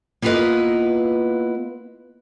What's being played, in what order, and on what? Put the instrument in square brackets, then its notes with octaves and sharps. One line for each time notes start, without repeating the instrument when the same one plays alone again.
[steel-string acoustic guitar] A#3 B3 E4 F4 B4 D#5